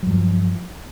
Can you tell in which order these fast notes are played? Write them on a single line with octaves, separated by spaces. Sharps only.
F#3 G2 F3